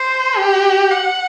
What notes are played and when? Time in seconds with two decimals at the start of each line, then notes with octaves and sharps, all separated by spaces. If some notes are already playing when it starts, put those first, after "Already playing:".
Already playing: C5
0.38 G4
0.91 F#5